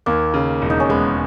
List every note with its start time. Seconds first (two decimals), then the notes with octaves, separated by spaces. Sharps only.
0.06 D#2 A#3
0.34 C#3
0.62 E1
0.70 D#4
0.80 C#4
0.90 G#3 B3